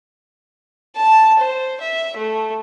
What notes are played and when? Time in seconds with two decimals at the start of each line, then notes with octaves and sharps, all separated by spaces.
0.96 A5
1.39 C5
1.81 E5
2.16 A3